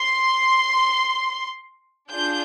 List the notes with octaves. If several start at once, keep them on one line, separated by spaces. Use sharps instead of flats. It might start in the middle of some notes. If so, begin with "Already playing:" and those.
Already playing: C6
D4 F4 G#4 G6